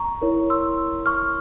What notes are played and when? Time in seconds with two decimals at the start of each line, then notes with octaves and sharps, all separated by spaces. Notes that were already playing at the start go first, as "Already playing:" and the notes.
Already playing: A#5 C#6
0.22 E4 A#4 C#5
0.50 C6 E6
1.06 C#6 F6